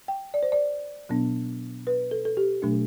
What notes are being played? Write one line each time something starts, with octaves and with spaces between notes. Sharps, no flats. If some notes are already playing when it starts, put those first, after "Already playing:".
G5
D5
C5
D5
B2 F#3 B3 D4
B4
A4
A4
G4
B2 F#3 A3 D4